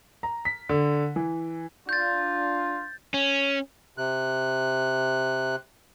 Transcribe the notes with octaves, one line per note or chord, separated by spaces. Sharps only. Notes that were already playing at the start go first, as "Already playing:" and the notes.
A#5
B6
D3
E3
D4 F4 G6 A6
C#4
C3 F#6